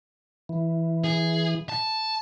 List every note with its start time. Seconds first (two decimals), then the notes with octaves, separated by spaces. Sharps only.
0.49 E3
1.04 G#4
1.69 A5